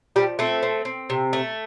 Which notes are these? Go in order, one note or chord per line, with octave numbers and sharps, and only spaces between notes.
F3 G3 G4
A3 C4 A4
C4
C4
C3
A3